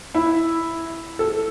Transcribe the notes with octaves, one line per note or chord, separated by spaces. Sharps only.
E4
A4